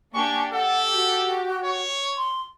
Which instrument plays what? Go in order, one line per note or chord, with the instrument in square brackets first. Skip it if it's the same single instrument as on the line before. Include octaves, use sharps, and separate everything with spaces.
[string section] A#3 D4 G4 [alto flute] G#5 [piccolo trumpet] C#6
[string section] G4 [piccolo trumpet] A4 [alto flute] F#5
[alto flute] F#4
[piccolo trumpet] C#5
[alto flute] C6